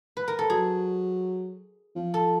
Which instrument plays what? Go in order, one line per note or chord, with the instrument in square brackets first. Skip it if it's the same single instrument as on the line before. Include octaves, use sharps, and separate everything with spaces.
[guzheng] B4
A#4
A4
[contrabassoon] F#3 [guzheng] G#4
[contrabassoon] F3
[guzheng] A4